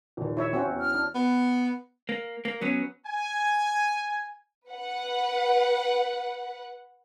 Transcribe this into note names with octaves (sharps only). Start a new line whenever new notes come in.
A#1 D#2
E4 C#5 E5
C4 C#4 F#4
E2
F6
D4
B3
A#3
A#3
F#3 B3 C#4
G#5
B4 F#5